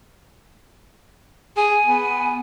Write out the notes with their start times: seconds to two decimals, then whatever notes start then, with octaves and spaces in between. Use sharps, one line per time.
1.57 G#4 G#5
1.86 B3